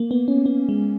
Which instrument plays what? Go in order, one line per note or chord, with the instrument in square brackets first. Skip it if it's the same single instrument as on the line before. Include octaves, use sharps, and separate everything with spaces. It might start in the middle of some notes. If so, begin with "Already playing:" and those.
Already playing: [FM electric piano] A#3
B3
C#4
B3
G#3